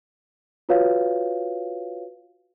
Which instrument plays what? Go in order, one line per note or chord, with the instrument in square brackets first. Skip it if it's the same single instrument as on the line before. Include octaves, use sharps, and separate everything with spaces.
[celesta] F4 F#4 B4 C#5 F5